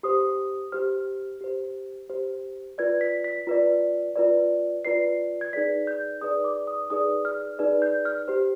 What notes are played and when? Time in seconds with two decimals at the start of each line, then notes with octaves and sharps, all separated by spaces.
0.03 G4 C5 D#6
0.72 G4 C5 F6
1.41 G4 C5
2.10 G4 C5
2.78 F4 B4 D5 G#6
3.01 B6
3.24 B6
3.47 F4 B4 D5
4.16 F4 B4 D5
4.85 F4 B4 D5 C7
5.41 G#6
5.53 D#4 G#4 B4 D5 B6
5.87 G6
6.21 D#4 G#4 B4 D5 D#6
6.44 D6
6.67 D#6
6.90 D#4 G#4 B4 D5 D#6
7.25 F6
7.59 D#4 G#4 B4 D5
7.82 G6
8.05 F6
8.28 G4 C5